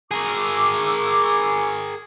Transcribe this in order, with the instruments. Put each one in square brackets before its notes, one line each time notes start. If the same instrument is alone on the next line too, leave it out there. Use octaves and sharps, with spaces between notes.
[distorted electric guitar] G#4 A#4 [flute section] C#6 D6 E6